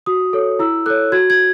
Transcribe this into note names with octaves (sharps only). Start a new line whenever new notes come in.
F#4 D#6
A4 C#5
E4 E6
A4 C#5 F#6
F#4 G#6
G#6